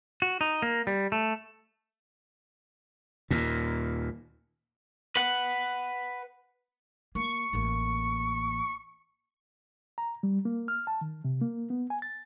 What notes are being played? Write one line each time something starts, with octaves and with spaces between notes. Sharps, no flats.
F#4
D#4
A#3
G3
A3
D#2 A#2
B4 F#5
A#3 C#6
A1 A#3
A#5
G3
A#3
F6
A5
D#3
C3
A#3
B3
G#5
A6